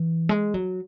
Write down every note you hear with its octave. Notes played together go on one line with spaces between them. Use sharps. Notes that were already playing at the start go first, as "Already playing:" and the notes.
Already playing: E3
G#3
F#3